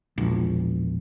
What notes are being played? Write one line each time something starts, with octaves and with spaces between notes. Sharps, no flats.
E1 A#1